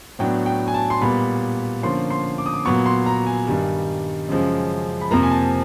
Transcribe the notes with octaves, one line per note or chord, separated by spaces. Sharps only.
A2 F#3 B3 D4 G5
G5
G#5
A5
C6
A#2 G3 B3 B5
D3 F3 A#3 C#4 C6
C6
D6
D#6
D6
A#2 F#3 B3 C#6
C6
A#5
G#5
G2 D#3 G3
F#2 C#3 F3 G#3
B5
F2 C3 F3 A#3 A#5
G#5
A5